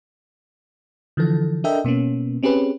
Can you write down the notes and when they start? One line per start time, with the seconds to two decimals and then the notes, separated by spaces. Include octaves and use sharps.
1.17 D3 E3 F3 A4
1.64 D4 A4 A#4 D#5 E5 G5
1.85 B2 A#3 B3 C#4
2.43 C4 C#4 G4 G#4 B4